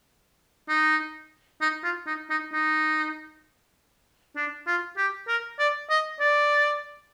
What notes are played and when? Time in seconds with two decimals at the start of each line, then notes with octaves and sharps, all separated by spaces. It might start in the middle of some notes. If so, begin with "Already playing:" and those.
0.69 D#4
1.61 D#4
1.84 F4
2.07 D#4
2.30 D#4
2.53 D#4
4.36 D4
4.67 F4
4.97 G4
5.28 A#4
5.59 D5
5.90 D#5
6.20 D5